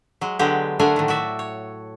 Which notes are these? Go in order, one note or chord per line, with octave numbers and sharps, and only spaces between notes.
F#3 G#3
D3 F#3 G#3 B3 G4
D3 A3 D4 A#4 F#5 G#5
A2 D#3
F#4 D5 E5
C#5